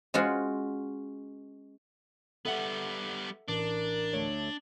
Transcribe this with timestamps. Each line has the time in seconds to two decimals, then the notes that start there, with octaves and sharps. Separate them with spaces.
0.14 G#3 C#4 F4 F#4
2.45 G3 B3 A4 E5 F#5
3.48 A1 D4 A#4
4.13 D2 A3 C#5